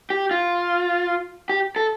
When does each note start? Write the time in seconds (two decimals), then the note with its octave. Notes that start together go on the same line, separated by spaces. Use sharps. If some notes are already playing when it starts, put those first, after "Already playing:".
0.10 G4
0.31 F4
1.49 G4
1.76 A4